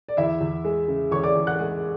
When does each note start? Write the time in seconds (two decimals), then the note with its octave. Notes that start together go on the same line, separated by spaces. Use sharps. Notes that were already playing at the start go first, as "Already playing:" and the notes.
0.08 D5
0.17 E2 E4 E5
0.41 E2
0.65 G#3
0.88 C#3
1.11 E2 C#5 C#6
1.23 D5 D6
1.35 E2
1.47 F#5 F#6
1.59 G#3